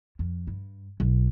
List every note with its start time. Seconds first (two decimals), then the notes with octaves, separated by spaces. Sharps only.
0.19 F2
0.47 G2
1.00 B1